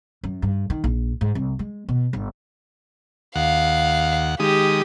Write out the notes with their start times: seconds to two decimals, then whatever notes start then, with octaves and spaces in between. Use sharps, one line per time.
0.24 F#2
0.42 G2
0.70 D#3
0.84 A#1
1.21 G#2
1.35 C2
1.59 G#3
1.89 B2
2.13 G1
3.36 D#2 F5 F#5
4.40 D#3 G#3 G4 D#6